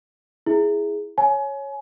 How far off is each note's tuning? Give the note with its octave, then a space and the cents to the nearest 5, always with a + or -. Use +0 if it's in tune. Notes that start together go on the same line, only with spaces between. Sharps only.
E4 -5 G#4 +0
C#5 -5 G#5 +30